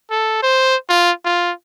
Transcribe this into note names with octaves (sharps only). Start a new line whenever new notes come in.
A4
C5
F4
F4